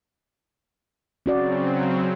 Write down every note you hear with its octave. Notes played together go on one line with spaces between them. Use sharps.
C#3 F#3 C4 C#4 F#4 D5